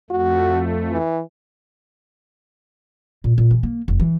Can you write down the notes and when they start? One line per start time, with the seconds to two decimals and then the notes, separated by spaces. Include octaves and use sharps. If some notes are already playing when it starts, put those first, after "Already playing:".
0.10 F2 A3 F#4
0.91 E3
3.24 A#2
3.38 A#2
3.51 E3
3.63 A#3
3.88 F1
4.00 E3